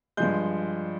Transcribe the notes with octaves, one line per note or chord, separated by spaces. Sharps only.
G2 F3 G#3 G6